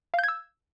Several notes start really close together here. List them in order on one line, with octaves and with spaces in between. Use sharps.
F5 G6 G#6 E6